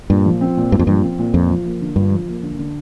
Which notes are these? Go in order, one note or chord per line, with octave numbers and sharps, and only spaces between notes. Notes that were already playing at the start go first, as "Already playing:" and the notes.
G2 A#2
F3
C4
A#2
G2 A#2
F2
G2 F3
C4
A#2
F2 F4
F3
A#3
D3
G2 F4
F3
A#3
D3
D3